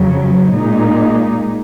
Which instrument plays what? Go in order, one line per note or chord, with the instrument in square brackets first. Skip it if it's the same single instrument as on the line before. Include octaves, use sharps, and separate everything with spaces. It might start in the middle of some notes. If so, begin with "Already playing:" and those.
Already playing: [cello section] F2 C#3 F#3
A#2 G#3 D#4